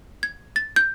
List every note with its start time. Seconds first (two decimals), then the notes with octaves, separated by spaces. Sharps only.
0.23 G#6
0.56 A6
0.76 G6